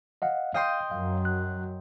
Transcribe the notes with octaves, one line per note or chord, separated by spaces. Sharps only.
D#5 F5 F#5
D#5 F5 G5 C6
F#2 F#3 F5
F#6